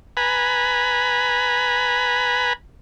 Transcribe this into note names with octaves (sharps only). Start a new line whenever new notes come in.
B4 G#5 A#5 B5